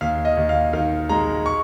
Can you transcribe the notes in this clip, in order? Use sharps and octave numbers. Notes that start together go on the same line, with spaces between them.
D#2 F5
D#5
D#2
F5
D#3 F5
G#3 A#5
C#6